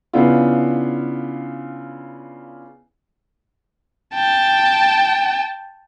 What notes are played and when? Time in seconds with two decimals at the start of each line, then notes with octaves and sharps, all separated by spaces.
0.13 C#3 B3 D4 E4 F4
4.15 G5 A5